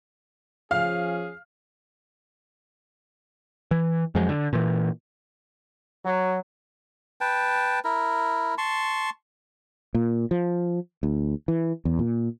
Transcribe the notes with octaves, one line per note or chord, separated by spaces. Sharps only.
F3 C#4 G#4 F5 F6
E3
F2 F3 F#3 G#3
D3
A#2 E3
F#3
B4 G5 A5
E4 A#4
A5 C6 C#6
A#2
F3
D2
E3
E2
A#2